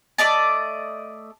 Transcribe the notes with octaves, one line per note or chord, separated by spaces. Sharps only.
A3 D5 D#5 A5